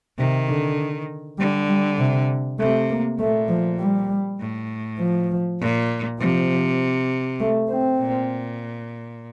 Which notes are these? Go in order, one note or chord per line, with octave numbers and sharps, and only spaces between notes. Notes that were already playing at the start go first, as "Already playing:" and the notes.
C3 D#3
D3
D3 G3
G3
C3
C3 A3
A#3
A#2 A3
F3
G3
A2
F3
A#2
C3 F3
A3
C4
A#2